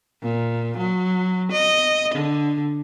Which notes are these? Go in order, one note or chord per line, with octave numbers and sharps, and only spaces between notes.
A#2
F#3
D#5
D3